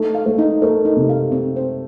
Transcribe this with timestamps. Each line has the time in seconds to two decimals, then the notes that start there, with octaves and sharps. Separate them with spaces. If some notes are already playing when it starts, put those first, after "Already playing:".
Already playing: A3 D#4
0.15 F5
0.26 A3
0.38 D#4
0.62 A3 A#4
0.85 D#4
0.97 C3
1.09 F5
1.32 C4
1.56 C5